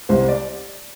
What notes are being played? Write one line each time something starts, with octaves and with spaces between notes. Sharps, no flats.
C2 C5
D5